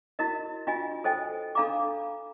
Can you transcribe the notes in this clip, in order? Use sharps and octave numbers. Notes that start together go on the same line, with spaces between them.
E4 F#4 A#4 D#5
D4 F4 F#4 D#5 G#5
A4 C5 D#5 G5 G#5
D4 A4 F5 A#5 B5 D6